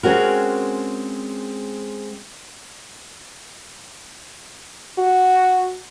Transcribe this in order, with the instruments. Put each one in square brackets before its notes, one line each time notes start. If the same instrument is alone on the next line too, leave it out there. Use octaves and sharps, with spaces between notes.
[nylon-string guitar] G#3 C4 C#4 F#4 A#4
[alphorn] F#4